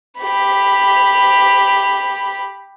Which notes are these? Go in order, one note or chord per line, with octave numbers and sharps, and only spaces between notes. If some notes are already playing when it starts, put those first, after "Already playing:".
G4 B5